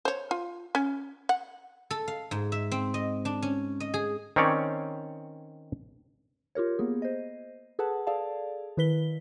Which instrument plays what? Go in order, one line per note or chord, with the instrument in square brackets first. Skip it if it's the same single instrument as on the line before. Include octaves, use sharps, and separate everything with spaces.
[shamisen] C5 C#5
F4
C#4
F#5
[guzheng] A4
F5
G#2
E5
C4
D#5
D4
C#4
D#5
G#4
[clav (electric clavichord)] D#3 C4 C#4 C#5 D5
[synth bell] F4 G4 A#4 C#5
A#3 B3 G#4
C5 D#5
G#4 A4 B4 F#5 A5
G#4 A4 D5 F5 A5
D#3 E4 B4 B6 G7